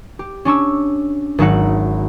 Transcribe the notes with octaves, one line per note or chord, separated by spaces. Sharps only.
G4
C#4 D4 C#6 E6
G#1 F#3 D#4 E5 F#5 C#7